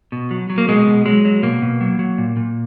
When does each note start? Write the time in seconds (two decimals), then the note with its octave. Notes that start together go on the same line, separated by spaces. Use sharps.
0.12 B2
0.31 F#3
0.50 F#3
0.58 A#3
0.68 B2 G#3
0.87 B2
1.06 F#3 G#3
1.25 F#3
1.43 B2 A#3
1.62 B2
1.81 F#3
1.99 F#3
2.18 A#2
2.37 A#2